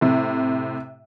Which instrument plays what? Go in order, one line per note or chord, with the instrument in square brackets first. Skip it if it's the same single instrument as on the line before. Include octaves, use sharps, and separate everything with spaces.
[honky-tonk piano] A2 C3